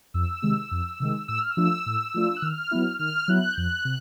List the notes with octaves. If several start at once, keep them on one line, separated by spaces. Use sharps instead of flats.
F2 E6
C3 D#3 G#3
F2
C3 D#3 G#3
A2 E6
F6
E6
F3 A3 D4 F4
A2
F3 A3 D4 F4
F#6
D#3 F6
F#3 B3 E4
D#3 F6
F#3 B3 E4 F#6
G6
F2 F#6
C3